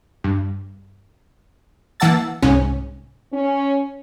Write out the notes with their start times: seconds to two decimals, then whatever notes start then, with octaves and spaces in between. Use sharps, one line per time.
0.24 G2
2.00 E3 A#3 F#5 A5 E6 A6
2.42 C2 G#2 C#4
3.33 C#4